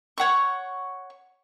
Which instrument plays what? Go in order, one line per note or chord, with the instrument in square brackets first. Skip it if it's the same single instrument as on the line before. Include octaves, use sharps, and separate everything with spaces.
[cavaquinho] C#5 F#5 C#6